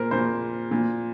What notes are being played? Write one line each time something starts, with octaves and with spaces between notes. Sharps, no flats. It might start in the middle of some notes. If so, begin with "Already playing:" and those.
Already playing: A#2 A#4 C5
A#2 C5
A#2